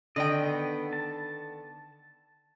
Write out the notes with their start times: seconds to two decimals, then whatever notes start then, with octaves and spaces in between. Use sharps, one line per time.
0.16 D3 D#3 D#5 G5
0.38 B3
0.93 A5